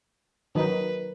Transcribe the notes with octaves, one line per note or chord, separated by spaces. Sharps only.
D#3 F#3 D#4 B4